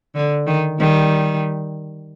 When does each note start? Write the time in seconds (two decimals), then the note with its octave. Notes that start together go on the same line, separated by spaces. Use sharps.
0.15 D3
0.47 D#3
0.79 D#3 G3